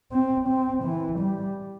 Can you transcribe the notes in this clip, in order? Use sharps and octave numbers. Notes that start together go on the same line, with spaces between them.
C4
C4
E3
G3